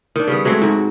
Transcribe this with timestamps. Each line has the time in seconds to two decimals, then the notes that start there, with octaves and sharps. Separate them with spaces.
0.16 D#3 D4
0.28 C#3 G3 B3
0.45 F#3 G#3 A3 C4
0.62 G#2 F#4